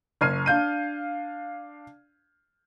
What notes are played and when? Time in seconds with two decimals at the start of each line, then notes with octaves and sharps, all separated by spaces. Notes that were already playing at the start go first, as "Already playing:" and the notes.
0.21 F#1 F6 G#6 C7 D#7
0.46 D4 F5 G6 D#7